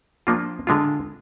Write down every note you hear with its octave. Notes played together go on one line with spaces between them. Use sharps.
F3 A#3 D4 F4
D3 G#3 D4 F4